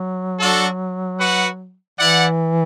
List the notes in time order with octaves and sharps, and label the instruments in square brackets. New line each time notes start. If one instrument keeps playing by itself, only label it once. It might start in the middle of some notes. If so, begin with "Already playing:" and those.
Already playing: [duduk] F#3
[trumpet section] D4 F#4 A4
F#4 B4 F#5
[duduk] E3 [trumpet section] E4 D5 F#5